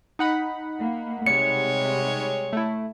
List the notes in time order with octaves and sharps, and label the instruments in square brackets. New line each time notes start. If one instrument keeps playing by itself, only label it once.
[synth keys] D#4 F#5 B5
[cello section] A#3
[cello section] C3 [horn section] G3 G#3 C#5 [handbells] C#7
[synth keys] A3 E4